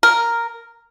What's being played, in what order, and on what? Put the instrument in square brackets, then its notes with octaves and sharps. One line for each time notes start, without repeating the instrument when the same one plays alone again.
[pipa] A#4